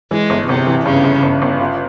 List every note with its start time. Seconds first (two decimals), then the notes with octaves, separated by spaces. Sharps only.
0.11 E3 G#3
0.30 G1
0.48 G1 C3
0.67 E3
0.85 G2 C#3
1.04 G1
1.23 G1
1.42 G1
1.60 F4